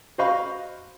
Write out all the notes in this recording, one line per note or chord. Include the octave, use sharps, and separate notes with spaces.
F#4 C5 D#5 F5 B5 C#6